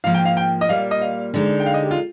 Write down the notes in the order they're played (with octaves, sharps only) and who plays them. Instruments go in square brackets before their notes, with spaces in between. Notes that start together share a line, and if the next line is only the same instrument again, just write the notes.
[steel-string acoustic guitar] G#2 F3 A#3 [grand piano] F5
[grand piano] G5
F5
G5
D#5
[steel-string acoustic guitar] A#2 G3 A#3 [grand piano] F5
[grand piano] D#5
F5
[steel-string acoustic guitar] D3 G#3 D#4
[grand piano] G5
F5
D#5
G4
F4